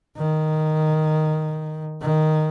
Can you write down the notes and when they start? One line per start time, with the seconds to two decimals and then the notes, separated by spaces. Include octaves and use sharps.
0.17 D#3
2.01 D#3